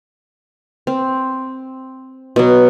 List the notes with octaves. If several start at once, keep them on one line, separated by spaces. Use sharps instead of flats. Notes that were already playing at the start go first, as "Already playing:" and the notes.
C4
B2 F#3